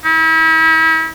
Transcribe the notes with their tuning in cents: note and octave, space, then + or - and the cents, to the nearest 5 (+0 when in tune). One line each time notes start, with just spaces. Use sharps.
E4 -40